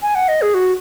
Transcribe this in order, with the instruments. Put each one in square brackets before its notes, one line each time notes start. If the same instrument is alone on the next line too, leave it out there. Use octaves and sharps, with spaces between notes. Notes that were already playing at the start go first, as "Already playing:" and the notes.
[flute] G#5
F#5
D#5
G#4
F#4